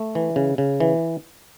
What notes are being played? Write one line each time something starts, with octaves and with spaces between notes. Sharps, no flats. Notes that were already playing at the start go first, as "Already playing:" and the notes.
Already playing: A3
E3
C#3
C#3
E3